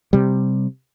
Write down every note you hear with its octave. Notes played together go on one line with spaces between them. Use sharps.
C3 G3